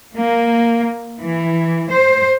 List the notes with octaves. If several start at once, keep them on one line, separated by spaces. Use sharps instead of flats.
A#3
E3
C5